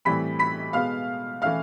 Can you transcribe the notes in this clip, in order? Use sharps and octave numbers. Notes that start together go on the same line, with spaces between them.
A2 E3 G3 C4 B5 B6
B5 B6
B2 G#3 B3 F5 F6
E3 A3 C#4 E4 F5 F6